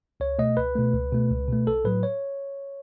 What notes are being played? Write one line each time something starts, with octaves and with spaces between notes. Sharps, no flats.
C#2 C#5
B2 A3 D#5
C#2 B4
B2 A3
C#2
B2 A3
C#2
B2 A3
B1 A4
A2 F#3 B4
C#5